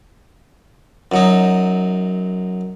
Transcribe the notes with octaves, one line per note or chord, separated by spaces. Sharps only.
F#2 F#3 D#4